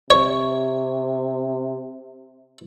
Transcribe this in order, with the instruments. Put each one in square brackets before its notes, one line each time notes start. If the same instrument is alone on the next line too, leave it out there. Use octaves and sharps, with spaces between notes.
[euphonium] C3 [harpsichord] C#5